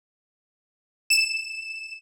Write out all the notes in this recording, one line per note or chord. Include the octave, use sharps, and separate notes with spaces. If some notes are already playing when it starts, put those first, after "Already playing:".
E7